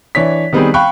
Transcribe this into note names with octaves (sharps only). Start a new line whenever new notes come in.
E3 D4 C#5 B6
D#3 G3 B3 C4 G#4 B4
F5 G5 B5 C#6 F#6